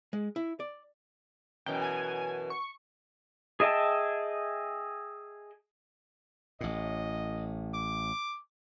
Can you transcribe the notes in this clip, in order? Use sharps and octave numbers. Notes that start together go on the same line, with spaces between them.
G#3
E4
D5
F#2 B2 E3 G5
G#5
C#6
G#4 D#5 E5 G5 A5
A1 A2 D#5
D6